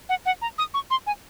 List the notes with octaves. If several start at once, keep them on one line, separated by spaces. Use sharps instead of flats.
F#5
F#5
A#5
D#6
C#6
C6
G#5